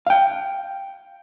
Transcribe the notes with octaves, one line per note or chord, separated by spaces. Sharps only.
F5 G5